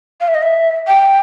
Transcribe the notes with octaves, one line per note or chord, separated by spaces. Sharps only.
F5
E5
D#5
E5
G5